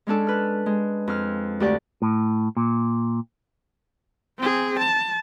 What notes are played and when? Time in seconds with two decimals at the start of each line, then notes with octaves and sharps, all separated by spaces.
0.07 G#3 C#4 D4 A4
0.27 B4 F6
0.66 G#3
1.07 F2 F6
1.60 D2 G4 D5 C#6
2.02 A2
2.57 A#2
4.38 C4 G#4
4.79 A5